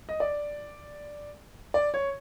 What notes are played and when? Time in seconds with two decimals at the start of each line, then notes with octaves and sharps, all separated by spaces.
0.09 D#5
0.20 D5
1.74 D5
1.94 C#5